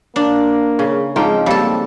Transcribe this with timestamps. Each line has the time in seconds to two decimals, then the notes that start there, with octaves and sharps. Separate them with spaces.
0.16 A#3 D4
0.79 C#3
1.16 G#2 F3 C4 G5 A#5
1.46 G3 A#3 G4 A4 F5